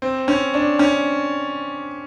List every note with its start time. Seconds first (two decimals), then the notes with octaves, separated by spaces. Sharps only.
0.02 C4
0.28 C#4
0.54 D4
0.79 C#4